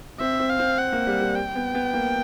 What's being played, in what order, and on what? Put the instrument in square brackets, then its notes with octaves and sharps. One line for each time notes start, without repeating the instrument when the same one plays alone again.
[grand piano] C4 [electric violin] E5
[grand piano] C4
[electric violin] F5
[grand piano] C4
[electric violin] F#5
[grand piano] A#3
G3
G3
[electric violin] G5
[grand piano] B3
B3
A#3